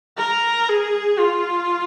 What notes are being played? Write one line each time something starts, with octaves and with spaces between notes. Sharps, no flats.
A#4
G#4
F4